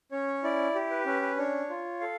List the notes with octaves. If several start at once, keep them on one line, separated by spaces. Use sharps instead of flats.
C#4 C#5
E4 D5
G4
B4
C#4 B4
B4
D4 C#5
F4
A4 F5